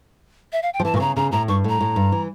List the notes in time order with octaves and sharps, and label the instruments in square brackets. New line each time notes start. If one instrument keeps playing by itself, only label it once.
[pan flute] E5
F5
G5
[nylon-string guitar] F3
[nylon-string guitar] E3 [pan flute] A5
[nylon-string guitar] A#2 [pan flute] C#6
[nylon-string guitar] C#3 [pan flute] A#5
[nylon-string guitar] C#3 [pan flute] A#5
[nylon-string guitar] A2 [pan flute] A#5
[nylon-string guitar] G2 [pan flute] C#6
[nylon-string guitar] A2 [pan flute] A#5
[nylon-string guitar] A2
G2
E3